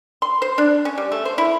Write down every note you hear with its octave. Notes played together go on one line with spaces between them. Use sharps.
C6
C5
D4
C#4
G3
A3
C5
E4